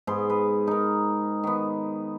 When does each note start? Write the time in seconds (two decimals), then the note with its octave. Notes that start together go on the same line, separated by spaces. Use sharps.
0.07 G#2 B3 C6
0.30 B4
0.67 D#4 A#4
1.44 D#3 B3